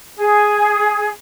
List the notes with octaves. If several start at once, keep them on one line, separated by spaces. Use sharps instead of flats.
G#4